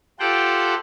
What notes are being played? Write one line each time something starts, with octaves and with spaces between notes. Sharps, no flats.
F4 G4 A4 C5 F#5 G5